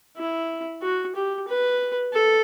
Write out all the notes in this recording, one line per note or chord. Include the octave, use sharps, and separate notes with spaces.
E4
F#4
G4
B4
A4